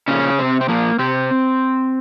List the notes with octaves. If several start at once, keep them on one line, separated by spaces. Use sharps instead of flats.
A#2 C#3 F3 C#4
C3 C4
C4
A#2 F3 A#3
C3 C4